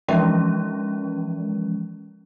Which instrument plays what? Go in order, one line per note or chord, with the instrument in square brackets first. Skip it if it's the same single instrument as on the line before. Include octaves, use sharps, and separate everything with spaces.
[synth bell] E3 F3 G#3 C#4